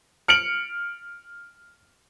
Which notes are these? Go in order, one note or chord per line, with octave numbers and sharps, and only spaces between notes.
F6 C#7 D7 F#7